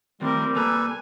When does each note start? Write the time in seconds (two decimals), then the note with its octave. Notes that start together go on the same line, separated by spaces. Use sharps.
0.21 D#3 F3 G3 A3 C4 A#4
0.56 C3 A#3 A4 B4 G#5 A#5